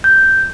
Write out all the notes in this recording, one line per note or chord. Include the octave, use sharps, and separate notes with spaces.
G6